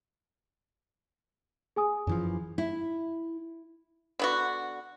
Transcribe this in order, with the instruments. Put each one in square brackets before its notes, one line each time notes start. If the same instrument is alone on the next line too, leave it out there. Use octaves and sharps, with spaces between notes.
[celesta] G#4 G#5 D#6
[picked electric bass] F#2 E3 F3
[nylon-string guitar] E4
[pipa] D3 B3 F#4